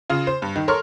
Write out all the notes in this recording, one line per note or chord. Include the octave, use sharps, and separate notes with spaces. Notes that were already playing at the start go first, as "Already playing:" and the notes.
C#3 F4
C5
G2
D#3
A4 A#4 C#5 C6 C#6 F6